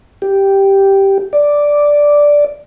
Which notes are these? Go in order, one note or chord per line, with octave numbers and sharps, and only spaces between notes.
G4
D5